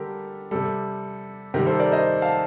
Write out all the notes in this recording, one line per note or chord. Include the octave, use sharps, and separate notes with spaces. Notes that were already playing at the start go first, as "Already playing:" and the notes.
Already playing: D3 G3 G4 A4 A#4
C3 G3 A4
C3 D#3 G3 G4 A#4
A4 C5
A#4 D5
C5 D#5
F5 A5